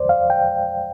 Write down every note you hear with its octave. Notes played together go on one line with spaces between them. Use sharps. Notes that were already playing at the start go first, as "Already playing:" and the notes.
Already playing: E2 C5 D5
F5
G5